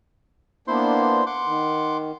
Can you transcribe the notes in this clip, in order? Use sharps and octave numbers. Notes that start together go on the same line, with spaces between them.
A#3 B3 D4 E4 C5 C6
F#5 C6 D6
D#3